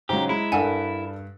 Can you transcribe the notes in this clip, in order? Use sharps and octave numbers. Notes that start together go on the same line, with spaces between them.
G#2 C#3 F#3 G4 C5 A#5
G#3 E4
G2 D4 A4 A#4 F#5 G#5